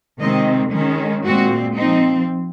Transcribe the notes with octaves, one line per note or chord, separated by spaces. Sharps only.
C3 D#3 G#3 C4 D#5
D#3 G#3 C#4
A#2 G#3 C4 F#4
F3 C4 D#4